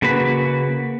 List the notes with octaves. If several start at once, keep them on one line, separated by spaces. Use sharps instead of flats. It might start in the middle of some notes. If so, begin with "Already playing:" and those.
C#3 A#3 F#4 B4 B5